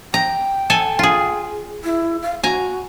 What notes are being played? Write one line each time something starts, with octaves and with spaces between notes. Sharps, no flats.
G5 A#5
A4 G#5
F4 G#4
E4
F5
F#4 G#5 A#5